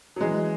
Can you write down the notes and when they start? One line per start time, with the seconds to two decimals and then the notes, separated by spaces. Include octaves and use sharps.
0.16 F#3
0.21 E3 G#3